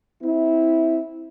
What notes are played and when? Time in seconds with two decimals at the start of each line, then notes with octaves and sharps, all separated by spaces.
0.23 C4 E4